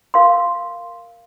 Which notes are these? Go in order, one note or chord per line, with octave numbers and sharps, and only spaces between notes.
A#4 F5 C6